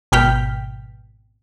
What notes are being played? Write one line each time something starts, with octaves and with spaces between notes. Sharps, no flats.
G#1 B2 G5 F6 G6 B6